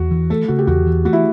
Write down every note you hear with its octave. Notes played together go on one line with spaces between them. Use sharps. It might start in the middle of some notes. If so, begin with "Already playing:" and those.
Already playing: E2 F#4
E3
A3 A4
C#3 F#4
G4
E2 F#4
E3
A3 F#4
E4